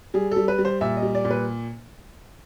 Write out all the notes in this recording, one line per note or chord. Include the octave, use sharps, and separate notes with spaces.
G3 G#4
G3 A4
B4
G3
C5
A#2 E5
D#5
G3
D5
A#2
B4